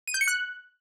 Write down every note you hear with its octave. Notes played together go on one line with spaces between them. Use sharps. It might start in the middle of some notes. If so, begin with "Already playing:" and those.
D#7
G6
C#7
F#6